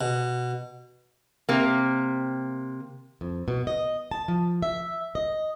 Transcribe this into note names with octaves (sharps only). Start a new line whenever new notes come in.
B2
C3 A#3
F2
B2
D#5
A5
F3
E5
D#5